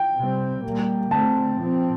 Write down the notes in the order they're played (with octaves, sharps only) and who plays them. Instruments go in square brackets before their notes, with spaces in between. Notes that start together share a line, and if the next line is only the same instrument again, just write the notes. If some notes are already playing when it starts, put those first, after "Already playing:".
Already playing: [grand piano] G5
[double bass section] C3 G3 C4
A#2 G3 A#3
[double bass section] D3 A3 C4 [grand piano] A5
[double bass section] A#2 F3 C4